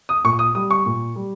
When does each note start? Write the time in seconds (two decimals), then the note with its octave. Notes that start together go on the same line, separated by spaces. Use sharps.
0.09 D#6
0.24 A#2 C#6
0.39 D#6
0.55 G3 D#6
0.71 C#6
0.86 A#2
1.16 G3